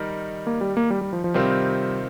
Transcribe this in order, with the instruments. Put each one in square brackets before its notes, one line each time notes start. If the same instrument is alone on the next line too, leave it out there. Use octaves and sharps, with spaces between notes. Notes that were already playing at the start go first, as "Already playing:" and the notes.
Already playing: [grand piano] D#3 G3 D#4 A#4
[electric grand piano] A#3
G3
A#3
G3
G3
F3
F3
[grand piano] C3 D#3 C4 F4 C5 [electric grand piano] G3